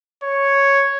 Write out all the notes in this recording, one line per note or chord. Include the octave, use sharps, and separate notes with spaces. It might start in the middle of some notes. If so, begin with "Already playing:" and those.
C#5